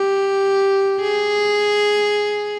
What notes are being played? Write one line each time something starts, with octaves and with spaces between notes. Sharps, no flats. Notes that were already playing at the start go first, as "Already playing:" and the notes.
Already playing: G4
G#4